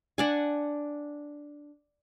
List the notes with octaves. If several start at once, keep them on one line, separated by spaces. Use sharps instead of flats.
D4 F#5 G#5